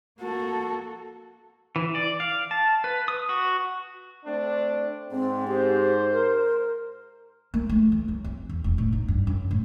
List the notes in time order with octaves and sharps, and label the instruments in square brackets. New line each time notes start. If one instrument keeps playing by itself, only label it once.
[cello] A#3 A4 [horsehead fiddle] F#4
[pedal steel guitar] E3
D5
F5
A5
B4
D#6
F#4
[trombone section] A3 C4 D4
[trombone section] G#2 [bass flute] C4
[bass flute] G4 [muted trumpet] C5
[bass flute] A#4
[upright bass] A#3
A3
E3
F#3
C4
E2
E1
A2
D#4
G2
F#2
A2